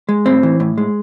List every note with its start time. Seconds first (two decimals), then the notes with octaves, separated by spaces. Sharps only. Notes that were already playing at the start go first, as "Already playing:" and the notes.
0.09 G#3
0.26 A2 C4
0.43 E3
0.60 A2
0.78 G#3